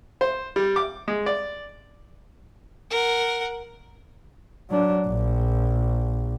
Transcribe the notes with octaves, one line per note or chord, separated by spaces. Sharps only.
C5
G3
D6
G#3
D5
A#4 F#5
F#3 D4
A#1